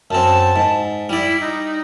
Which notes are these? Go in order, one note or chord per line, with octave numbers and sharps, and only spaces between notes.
F#2 C4 A5
G#2
G3 E4 D5
D#4